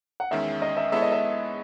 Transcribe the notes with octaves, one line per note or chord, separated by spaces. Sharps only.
F#5
E2 D#3 G#3 C#4 E5
D#5
E5
G#3 B3 E4 A4 C#5 E5
D#5
E5